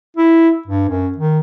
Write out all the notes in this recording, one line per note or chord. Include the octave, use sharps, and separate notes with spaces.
E4
G2
F#2
D#3